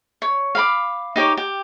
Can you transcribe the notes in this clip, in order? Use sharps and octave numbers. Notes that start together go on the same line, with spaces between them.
C#5
F5 B5 D6
D#4 G4 C#5 D6
G4